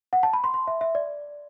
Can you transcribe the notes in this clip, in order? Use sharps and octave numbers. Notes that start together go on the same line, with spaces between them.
F#5
A5
B5
C6
C6
E5
E5
D5